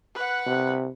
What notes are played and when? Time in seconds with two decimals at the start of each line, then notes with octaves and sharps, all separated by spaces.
0.15 B4 F#5
0.46 C3